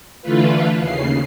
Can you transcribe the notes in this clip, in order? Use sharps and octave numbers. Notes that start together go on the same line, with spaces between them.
D3 E3 A3 F4 B4
D#2 C#3 C7